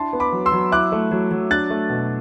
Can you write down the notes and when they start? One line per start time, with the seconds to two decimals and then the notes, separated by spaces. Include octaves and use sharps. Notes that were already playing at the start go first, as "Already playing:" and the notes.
Already playing: D4 E4 A5 C6
0.13 B3
0.20 B5 D6
0.32 F#3
0.46 C6 E6
0.52 F#3
0.72 E4 D6 F#6
0.92 A3
1.11 F#3
1.31 F#3
1.50 D4 F#6 A6
1.70 A3
1.90 B2